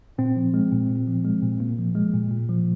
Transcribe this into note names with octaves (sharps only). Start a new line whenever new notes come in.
A#2 C4
F3
G#3
A#2
A#2
F3
G#3
A#2
A#2 A#3
F3
G#3
A#2
A#2
F3